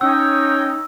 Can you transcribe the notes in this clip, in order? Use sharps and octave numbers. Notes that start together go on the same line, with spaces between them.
C#4 D#4 C#5 G5 E6